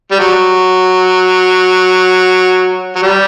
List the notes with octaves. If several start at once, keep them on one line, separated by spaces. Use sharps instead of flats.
G3
F#3
F#3
G3